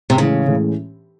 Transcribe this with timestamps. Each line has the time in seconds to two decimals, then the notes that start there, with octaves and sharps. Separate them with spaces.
0.10 C3
0.18 A2 C#3 E3 G#3 C#4
0.47 A2 E3 G#3 C#4